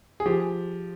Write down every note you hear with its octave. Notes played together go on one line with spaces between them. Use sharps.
G#4
F3 G4